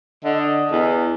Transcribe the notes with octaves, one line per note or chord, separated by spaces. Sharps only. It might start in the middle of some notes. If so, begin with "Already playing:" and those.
D3 D#5
E2